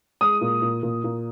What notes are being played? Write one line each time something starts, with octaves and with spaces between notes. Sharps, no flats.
G#3 D#6
A#2
A#2
A#2
A#2